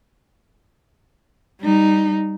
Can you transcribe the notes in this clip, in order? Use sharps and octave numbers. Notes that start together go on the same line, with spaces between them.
G3 D#4